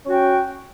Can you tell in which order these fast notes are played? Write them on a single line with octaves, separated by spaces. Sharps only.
C#4 F#4 G5